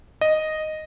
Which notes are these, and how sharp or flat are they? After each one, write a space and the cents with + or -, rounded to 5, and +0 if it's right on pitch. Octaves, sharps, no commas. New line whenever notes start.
D#5 -5